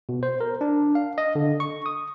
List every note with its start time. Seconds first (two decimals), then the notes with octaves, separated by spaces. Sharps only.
0.09 B2
0.23 C5
0.41 A#4
0.61 D4
0.95 F5
1.18 D#5
1.35 D3
1.60 C#6
1.86 D#6